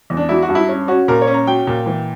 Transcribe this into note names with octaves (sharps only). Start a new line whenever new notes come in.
E2
D4
F#3 E4
F#4
G2
E4
C#4
C#4 F#4
A#2 A#4
C#5
C#4
A#5
F#3 G5
A#2
E3